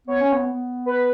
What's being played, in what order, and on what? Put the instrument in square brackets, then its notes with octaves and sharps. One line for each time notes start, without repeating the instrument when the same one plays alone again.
[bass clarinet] B3 [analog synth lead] C#5
[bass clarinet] C#4
B3
B3
[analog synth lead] B4